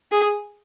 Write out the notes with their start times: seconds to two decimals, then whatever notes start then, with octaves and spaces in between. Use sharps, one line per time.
0.12 G#4